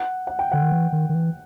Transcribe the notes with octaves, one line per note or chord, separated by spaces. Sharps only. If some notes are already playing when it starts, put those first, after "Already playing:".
Already playing: F#5
F#5
G5
D3 F#5
D#3
E3
D#3
D#3
E3